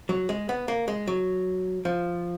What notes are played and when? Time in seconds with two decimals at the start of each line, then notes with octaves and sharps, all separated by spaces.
0.09 F#3
0.29 G#3
0.49 B3
0.68 A#3
0.88 G#3
1.07 F#3
1.85 F3